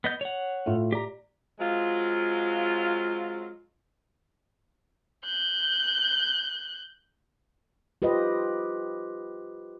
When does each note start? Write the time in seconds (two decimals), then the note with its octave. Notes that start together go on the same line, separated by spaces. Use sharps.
0.04 B3 D#5 G6
0.21 C#5 F#5
0.66 A2 A3 F4
0.92 G4 D5 A#5
1.60 F#3 G#3 C4 F4
5.25 F#6 G6
8.02 F4 G4 B4 C5 D#5